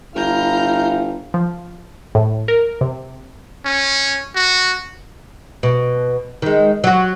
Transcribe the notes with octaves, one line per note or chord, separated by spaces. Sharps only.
G1 E4 F5 A#5 F6 G6
F3
A2
A#4
C3
C#4
F#4
B2
D#3 G#3
F#3 F#4